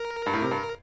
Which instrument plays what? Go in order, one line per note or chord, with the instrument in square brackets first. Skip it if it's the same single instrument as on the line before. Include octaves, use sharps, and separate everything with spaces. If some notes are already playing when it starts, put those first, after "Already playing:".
Already playing: [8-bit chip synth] A#4
[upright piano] G2
A2
C3
G2